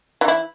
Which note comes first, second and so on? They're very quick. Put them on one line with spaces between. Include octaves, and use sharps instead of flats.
E3 D#4 E4